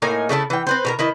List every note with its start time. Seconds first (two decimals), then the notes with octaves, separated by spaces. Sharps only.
0.02 A2 A#3 D#4 G#5
0.29 C#3 A3 E4 A5
0.50 E3 G5
0.67 C4 B4 C5
0.85 B2 A4 A#4
0.99 D#3 E4 D#5